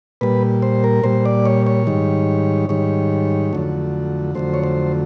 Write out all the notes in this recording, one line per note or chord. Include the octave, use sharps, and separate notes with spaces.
A#2 G3 B4
C5
A#4
A#2 G3 C5
D5
C#5
C#5
G#2 D#3 G3
G#2 D#3 G3 C#5
F2 D3 F#3 A3
F2 D3 F#3 A3 C5
C#5
C5